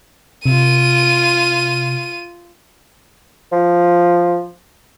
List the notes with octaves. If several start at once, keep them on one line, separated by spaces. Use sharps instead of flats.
C3 F4 D#7
F3